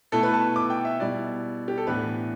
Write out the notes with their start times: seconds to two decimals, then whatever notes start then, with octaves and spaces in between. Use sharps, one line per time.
0.12 B2 A3 E4 A4
0.23 B4
0.33 A5
0.56 D6
0.70 G5
0.85 E5
1.00 B2 G3 E4 D5
1.68 G4
1.78 A4
1.87 A2 E3 B3 D4 B4